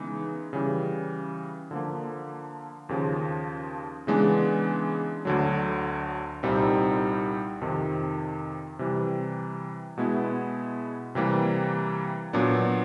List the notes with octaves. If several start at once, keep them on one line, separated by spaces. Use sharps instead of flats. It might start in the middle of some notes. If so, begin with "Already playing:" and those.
Already playing: C#3 E3 G#3 B3 D#4
C#3 E3 G3
D3 F3 A#3
D#2 C#3 F3
C#3 E3 G#3 B3 D4
D2 D3 F#3
C2 A#2 G3 C4 D#4
F2 C3 D#3
C3 E3 G3
B2 G#3 B3 E4
C3 E3 G3 A#3
A#2 F#3 B3 D4